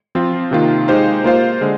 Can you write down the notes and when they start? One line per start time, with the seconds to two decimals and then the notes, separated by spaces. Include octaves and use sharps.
0.15 F3 C4 F4
0.51 C3 D#3 A#3 F4
0.88 G#3 D#4 G4 C5 F5
1.24 A#3 F4 C5 F5
1.61 D3 G#3